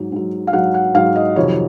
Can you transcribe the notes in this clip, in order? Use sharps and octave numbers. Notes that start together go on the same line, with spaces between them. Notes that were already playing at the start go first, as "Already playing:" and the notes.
Already playing: G#2 F#3
G#2 F#3
F5
G#2 F#3 F#5
F#5
G#2 F#3 F5
D#5
F2 C3 D#3 F#3 C#5